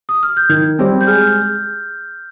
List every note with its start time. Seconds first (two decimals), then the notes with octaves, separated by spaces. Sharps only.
0.09 D#6
0.23 F6
0.37 G6
0.49 D#3 G#6
0.79 G3 C4
1.01 G6
1.07 G#3 F6